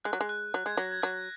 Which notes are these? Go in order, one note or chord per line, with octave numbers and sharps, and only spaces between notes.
G#3 F#6
F#3
G#3
F#6
F#3 F#6
G#3 G#6
F#3 A#6
G#6
F#3 F#6